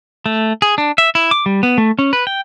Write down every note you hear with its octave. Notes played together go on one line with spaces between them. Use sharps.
A3
G#4
D4
E5
E4
D6
G3
B3
A3
C#4
B4
G5